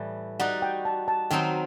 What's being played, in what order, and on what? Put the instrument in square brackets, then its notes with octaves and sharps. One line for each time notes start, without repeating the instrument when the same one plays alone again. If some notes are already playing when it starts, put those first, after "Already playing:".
Already playing: [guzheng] A2 E3 G3
[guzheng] G3 D#4 F#4 [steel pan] F#5
[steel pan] G5
A5
A5
[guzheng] D#3 F#3 C4 D#4 [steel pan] G5